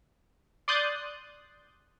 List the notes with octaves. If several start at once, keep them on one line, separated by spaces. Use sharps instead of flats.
D5 C6 D#6 F#6 G6 A6